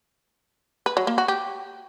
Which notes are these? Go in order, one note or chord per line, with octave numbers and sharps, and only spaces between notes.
B4
F#3
A#3
F#4
G4